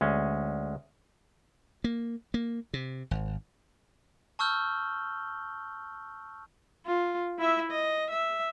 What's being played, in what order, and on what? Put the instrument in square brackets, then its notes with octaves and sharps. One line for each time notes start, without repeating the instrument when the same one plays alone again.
[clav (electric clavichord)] D2 G#3 C#4
[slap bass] A#3
A#3
C3
G#1
[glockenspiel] A5 C#6 E6 F6 G6 G7
[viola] F4
E4 E5
D#5
E5